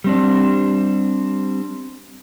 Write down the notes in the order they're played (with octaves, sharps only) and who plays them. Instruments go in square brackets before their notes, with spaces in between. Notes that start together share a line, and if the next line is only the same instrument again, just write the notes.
[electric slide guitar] G3 C4 D4